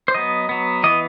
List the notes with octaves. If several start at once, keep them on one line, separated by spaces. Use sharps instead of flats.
C5
F#3 B3 D#5
F#3 B3
E3 B3 D#5